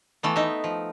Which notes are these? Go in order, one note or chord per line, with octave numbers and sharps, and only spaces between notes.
E3 A3 B3
D#4 E5
F3